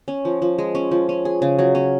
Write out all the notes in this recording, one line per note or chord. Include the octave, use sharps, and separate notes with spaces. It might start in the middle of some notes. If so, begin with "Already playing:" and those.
C#4
F3
F3
G#3
C#4
F3
C#4
G#4
C#3
F#3
C#4